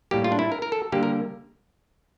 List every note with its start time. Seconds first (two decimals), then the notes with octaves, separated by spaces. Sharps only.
0.11 A2 G3 A#3 G4
0.24 F4
0.32 D4
0.39 E4
0.52 A#4
0.62 A#4
0.72 A4
0.92 D3 G3 A#3 G4
1.03 A#4